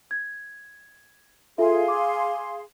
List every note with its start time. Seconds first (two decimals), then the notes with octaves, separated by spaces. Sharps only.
0.11 G#6
1.58 F4 G#4 A4 E5 F5 C6
1.88 D6